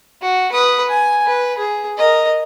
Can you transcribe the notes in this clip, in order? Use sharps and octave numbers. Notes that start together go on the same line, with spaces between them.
F#4
B4 D#6
G#5
B4
G#4
A#4 D#5